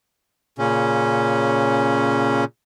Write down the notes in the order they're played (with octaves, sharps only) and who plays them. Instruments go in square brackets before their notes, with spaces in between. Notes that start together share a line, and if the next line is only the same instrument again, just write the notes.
[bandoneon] A#2 C#3 C#4